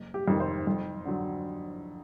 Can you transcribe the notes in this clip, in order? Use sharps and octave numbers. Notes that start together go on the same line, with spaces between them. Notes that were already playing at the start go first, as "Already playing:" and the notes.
Already playing: F#1
G4
F2 C3 D#3
C5
F2
D3 F#3